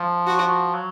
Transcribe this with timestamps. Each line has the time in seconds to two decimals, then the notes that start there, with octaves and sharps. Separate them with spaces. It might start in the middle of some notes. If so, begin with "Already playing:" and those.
Already playing: F3
0.27 F#4
0.74 F#3